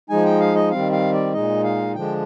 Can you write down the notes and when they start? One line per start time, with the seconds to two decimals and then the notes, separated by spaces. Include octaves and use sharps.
0.10 F3 G#3 D#4 G#5
0.25 G5
0.41 F5
0.55 D#5
0.71 D#3 G3 C4 F5
0.92 F5
1.13 D5
1.33 A#2 G#3 D#4 D#5
1.64 F5
1.95 D3 F3 G#3 D4 G5